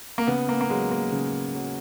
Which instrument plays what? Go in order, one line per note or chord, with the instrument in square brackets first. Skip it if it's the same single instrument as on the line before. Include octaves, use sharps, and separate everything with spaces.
[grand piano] A#3
C#3 B3
A#3
A#3
F#3 G#3
A#3
C#3
F#3